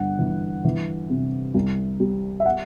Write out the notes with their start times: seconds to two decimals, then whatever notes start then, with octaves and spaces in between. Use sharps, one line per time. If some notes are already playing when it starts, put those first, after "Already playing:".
Already playing: G1 F#5
0.19 E3
0.64 E3
1.10 C3
1.54 C2
2.00 G3
2.40 E5
2.46 F#5